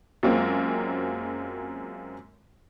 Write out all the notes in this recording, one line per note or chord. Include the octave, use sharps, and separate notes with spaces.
F#2 F#3 G#3 A#3 C4 F4